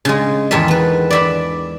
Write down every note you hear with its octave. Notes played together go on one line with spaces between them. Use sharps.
C#3 G#3
E2 G#2 D#3 A4 E5
B3 B4
D5 E5 B5